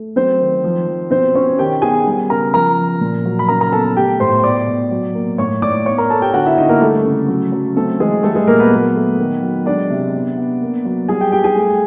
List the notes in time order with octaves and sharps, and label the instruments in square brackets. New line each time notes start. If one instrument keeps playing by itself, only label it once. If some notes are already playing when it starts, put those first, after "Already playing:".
Already playing: [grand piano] A3
F#3 C4 C5
D#3
F3
F3
B2 C4 C5
B2 C#4 C#5
D#3 G4 G5
B3 G#4 G#5
G3
C#3 A#4 A#5
F3 A#4 A#5
F3
A#2
F#3
B5
C#3 A#4 A#5
A#4 A#5
B3 A4 A5
A3 G4 G5
A2 C5 C6
B2 D5 D6
B2
F#3
A#3
A2 C#5 C#6
A2 D5 D6
B3 C#5 C#6
A#4 A#5
B3 A4 A5
G4 G5
D3 F#4 F#5
E4 E5
D3 D#4 D#5
A#3 A#4
G3 A3 A4
C#3
F#3
F#3
A3 C4 A4
E3 G#3 G#4
G3 A3 A4
G#3 G#4
A#2 A#3 A#4
B3 B4
F#3
A3
D#3
F#3
G#3 D4 D5
C3
B3
B3
A#3
F#3
G3 G#4 G#5
G4 G5
G3 G4 G5
G#4 G#5
A3